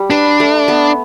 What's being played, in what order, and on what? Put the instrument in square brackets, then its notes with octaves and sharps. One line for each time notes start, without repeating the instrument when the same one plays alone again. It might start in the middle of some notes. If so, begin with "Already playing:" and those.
Already playing: [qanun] G3
[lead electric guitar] D4 [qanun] B4
[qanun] A3
B3